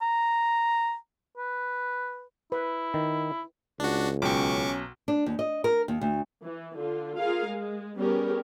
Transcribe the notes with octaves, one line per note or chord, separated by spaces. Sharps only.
A#5
B4
E4 B4
D#3
C#2 D4 F#4
B1 B2 C#4 G5 C#6 D6
D4
D#2
D#5
A#4
D#2
D2
E3
D3 F4
F4 G#4 A#4 F5
G#3
G3 B3 C#4 G4 G#4 A#4